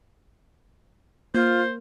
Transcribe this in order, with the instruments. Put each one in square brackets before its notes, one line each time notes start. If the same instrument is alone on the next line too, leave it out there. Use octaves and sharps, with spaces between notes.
[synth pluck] A#3 [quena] F4 [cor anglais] C5